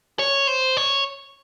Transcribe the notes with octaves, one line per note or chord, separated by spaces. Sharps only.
C#5
C5
C#5